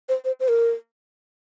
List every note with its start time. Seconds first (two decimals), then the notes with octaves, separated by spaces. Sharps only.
0.09 C5
0.25 C5
0.40 C5
0.48 A#4